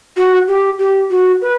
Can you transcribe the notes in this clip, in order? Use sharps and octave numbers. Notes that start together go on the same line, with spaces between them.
F#4
G4
G4
F#4
B4